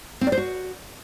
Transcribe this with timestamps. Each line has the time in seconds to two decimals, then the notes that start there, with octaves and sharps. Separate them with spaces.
0.21 C4
0.27 D5
0.32 C5
0.38 F#4